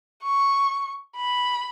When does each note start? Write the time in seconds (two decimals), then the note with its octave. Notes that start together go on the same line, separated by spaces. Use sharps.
0.23 C#6
1.17 B5